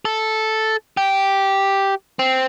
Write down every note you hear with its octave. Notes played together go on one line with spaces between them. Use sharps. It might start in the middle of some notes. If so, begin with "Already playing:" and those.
A4
G4
C4